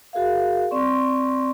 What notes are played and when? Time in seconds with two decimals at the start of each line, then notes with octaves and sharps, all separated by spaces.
0.13 F#4 G#4 A#4 E5 F5
0.71 C4 D5 C6 C#6